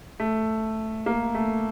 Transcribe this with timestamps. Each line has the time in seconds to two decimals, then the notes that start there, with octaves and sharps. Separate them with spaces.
0.20 A3
1.06 A#3
1.35 A3